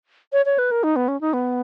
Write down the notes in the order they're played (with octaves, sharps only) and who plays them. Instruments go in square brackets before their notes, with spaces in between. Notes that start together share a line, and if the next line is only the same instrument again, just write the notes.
[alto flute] C#5
C#5
B4
A#4
D#4
B3
C#4
D#4
B3